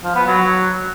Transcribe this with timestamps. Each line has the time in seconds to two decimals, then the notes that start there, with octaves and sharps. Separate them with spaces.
0.04 F3
0.15 B3
0.27 F#3